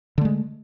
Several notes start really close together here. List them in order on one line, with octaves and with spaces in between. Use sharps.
D3 A3 G#3